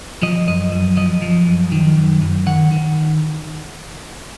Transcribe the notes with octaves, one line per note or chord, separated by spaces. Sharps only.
F3 D#5
F#2 D#5
F#2
F3 D#5
F3
F#2
D#3
F#2
F#2
D#3 F#5
D#3